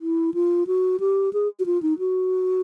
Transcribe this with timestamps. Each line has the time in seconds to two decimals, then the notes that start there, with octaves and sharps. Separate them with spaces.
0.01 E4
0.34 F4
0.67 F#4
1.00 G4
1.33 G#4
1.59 F#4
1.66 F4
1.82 D#4
1.99 F#4